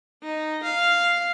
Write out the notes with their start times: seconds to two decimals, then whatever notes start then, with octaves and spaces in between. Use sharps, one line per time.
0.23 D#4
0.63 F5